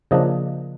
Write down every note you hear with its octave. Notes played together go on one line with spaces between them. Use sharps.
C#3 F3 A#3 D4 D#5